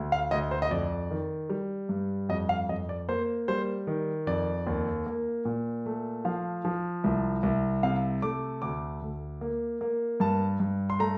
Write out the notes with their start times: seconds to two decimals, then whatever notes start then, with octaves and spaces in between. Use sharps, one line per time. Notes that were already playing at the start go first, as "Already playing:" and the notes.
Already playing: D2
0.12 F5
0.31 D2 D#5
0.51 C5
0.62 D#5
0.71 F2 D5
1.11 D#3
1.49 G3
1.89 G2
2.29 F2 D#5
2.49 F5
2.69 F2 D#5
2.89 D5
3.09 A#3 C5
3.48 G3 C5
3.87 D#3
4.27 F2 D5
4.67 D#2
5.06 A#3
5.45 A#2
5.86 A3
6.25 F3 F5
6.65 F3
7.04 C2
7.43 C2
7.83 C3 F5
8.22 A3 D6
8.62 D2 D6
9.02 D2
9.41 A#3
9.81 A#3
10.20 G2 A5
10.60 G2
10.90 C6
10.99 A3 A#5